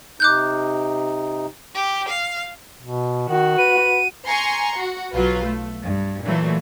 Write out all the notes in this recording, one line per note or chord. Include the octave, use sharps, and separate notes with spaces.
C3 D#4 D6 F#6 G6
G4
F5
B2
D#3 F#4
B4 D#7
G#5 A#5 C6 C#6
F#4
B1 F#3 F4 B4
A3
G2
A#2 E3 F#3 A3